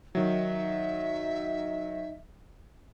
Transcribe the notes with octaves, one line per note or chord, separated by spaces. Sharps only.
D#3 F#3 D#4 E5